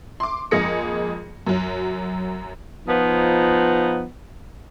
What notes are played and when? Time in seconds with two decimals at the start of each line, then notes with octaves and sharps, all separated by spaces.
0.20 C6 D6
0.51 F2 G#3 A#3 G#4 A#6 C#7
1.47 F#2 F#3
2.88 F3 B3 D#4